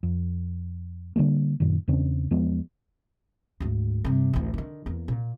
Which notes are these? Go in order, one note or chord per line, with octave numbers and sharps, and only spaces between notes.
F2
D3 D#3 G3 A#3
F#2 A#2 D#3
E2 C#3 C4 D4
E2 F3 G#3 B3
D2 G#2
G2 C3
A1 D2
D3 D#3
E2 A#3
A#2